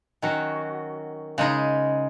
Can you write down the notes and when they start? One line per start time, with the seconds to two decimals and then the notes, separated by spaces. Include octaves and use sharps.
0.22 D#3 F#3 C#4 F#4
1.38 C#3 G#3 D#4